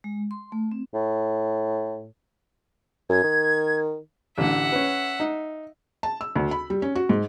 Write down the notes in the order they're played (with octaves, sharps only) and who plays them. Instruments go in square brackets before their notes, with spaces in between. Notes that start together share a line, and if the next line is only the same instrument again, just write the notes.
[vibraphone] G#3
C6
A3
C4
[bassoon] A2
[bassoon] F#2 [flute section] G#6
[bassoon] D#3
[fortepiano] A1 D3 [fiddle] E5 F#5
[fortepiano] C#4 B4
D#4
[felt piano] A5
E6
D2
B5
G3
C#4
F#4
G#2